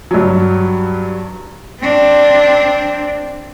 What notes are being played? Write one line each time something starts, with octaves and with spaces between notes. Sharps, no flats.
G2 F#3
C4 D4